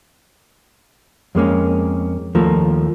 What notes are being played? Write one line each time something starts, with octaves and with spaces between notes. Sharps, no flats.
F2 G#3 A#3 C#4
D#2 F3 A3 A#3